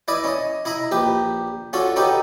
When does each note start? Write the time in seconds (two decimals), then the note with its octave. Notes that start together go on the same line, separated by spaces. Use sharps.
0.08 E4 B4 D5 D#5
0.24 C#4 D#5
0.65 E4 D#5 A#5 B5
0.91 A#1 G4 B4
1.73 C#4 D4 F4 F#4 A4
1.96 C#4 D#4 F#4 G4 A4 B4